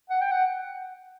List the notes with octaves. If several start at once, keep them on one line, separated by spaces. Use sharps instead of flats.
F#5
G5
F#5